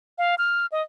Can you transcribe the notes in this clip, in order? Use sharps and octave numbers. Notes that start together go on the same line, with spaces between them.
F5
F6
D#5